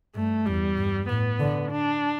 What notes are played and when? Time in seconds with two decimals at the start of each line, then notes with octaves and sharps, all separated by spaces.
0.15 G2 A3
0.46 E2 G3
0.77 G2
1.09 A2 B3
1.40 D3
1.71 D4